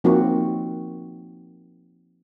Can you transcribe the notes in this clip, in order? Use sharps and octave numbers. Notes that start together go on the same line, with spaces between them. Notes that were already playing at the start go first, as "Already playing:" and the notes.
F3 A#3 C4 D#4 F#4